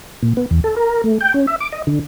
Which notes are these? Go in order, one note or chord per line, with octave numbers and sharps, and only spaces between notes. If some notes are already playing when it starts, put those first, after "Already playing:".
A#2
B3
E2
A4
A#4
A3
G5
C#4
E5
D6
D#5
D3